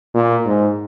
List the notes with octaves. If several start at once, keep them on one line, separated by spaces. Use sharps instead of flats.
A#2
G#2